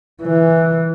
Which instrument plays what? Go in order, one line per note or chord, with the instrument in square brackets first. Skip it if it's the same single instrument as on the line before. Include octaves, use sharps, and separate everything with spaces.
[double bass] E3